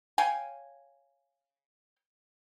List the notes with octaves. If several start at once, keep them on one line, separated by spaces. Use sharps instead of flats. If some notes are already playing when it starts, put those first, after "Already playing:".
C#5 F5 G5 G#5